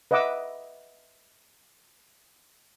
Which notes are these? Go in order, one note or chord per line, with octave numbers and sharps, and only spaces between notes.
B4 D#5 E5 F#5 D6 E6